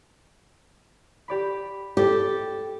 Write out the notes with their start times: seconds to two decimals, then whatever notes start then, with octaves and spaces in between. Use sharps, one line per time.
1.28 G4 D5 B5
1.97 G4 A4